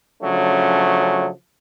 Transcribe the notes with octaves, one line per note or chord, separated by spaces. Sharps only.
C#3 F3 F#3 A3 C#4 D4